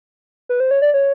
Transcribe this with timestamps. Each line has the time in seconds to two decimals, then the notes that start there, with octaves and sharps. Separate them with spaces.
0.49 B4
0.60 C5
0.71 C#5
0.82 D5
0.94 C#5